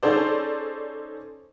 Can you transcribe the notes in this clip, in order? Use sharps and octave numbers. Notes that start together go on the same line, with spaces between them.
C#4 D#4 G#4 A4 C5 D5